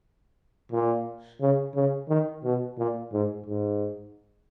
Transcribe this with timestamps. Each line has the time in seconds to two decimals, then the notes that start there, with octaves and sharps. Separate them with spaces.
0.72 A#2
1.41 C#3
1.75 C#3
2.09 D#3
2.44 B2
2.78 A#2
3.13 G#2
3.46 G#2